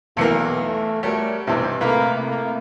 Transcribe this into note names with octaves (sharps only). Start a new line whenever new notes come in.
B1 E2 E3 A#3 F5 C#7
A3
G3 A3 F#4 A#4 C#5
B1 E2 G2 C3 E4 C6
A2 C3 A3 A#3 B4
A#3